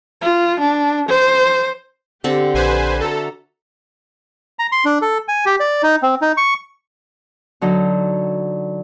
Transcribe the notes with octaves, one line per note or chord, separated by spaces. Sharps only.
F4
D4
C5
D3 C4 G4
A#1 B4 C5 G#5
F#4 A4 E5 A#5
A#5
C6
D4
A4
G#5
G4
D5
D#4
C4
D#4
C#6
D3 F#3 D#4